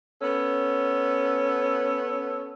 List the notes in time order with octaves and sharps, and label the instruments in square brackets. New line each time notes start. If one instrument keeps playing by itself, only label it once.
[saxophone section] B3 C#4 A4